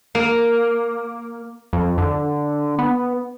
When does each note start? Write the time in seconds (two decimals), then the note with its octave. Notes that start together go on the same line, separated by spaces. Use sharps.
0.15 A#3
1.73 F2
1.98 D3
2.78 B3